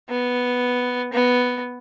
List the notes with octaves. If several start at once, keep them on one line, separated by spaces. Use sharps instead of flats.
B3
B3